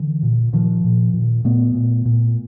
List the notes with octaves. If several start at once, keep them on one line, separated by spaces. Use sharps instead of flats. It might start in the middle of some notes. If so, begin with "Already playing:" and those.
Already playing: D3 E3
A#2
A#2 D#3 F3
A#2
A#2
A#2 A3 B3
A#2
A#2